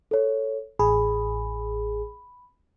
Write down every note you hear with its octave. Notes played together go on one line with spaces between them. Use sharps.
A4 C#5
A1 G#4 B5